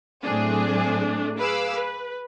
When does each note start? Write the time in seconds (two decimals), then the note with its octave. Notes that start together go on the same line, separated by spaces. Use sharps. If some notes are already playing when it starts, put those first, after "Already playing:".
0.24 A2 F#3 A3 C4 D4 G#4
1.38 G#4 B4 F5 B5 D6 E6
1.76 B4